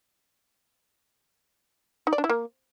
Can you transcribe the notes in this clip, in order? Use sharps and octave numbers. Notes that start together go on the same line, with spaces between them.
D#4
D5
D4
E4
A#3